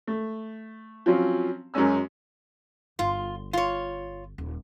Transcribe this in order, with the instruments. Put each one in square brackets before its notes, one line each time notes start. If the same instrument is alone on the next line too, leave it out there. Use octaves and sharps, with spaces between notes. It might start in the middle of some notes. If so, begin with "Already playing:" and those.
[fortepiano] A3
F3 F#3 C4 C#4
F#2 F#3 G#3 C#4 E6
[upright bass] G1 [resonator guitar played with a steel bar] F4
[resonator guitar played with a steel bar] F4 C#5
[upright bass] D#1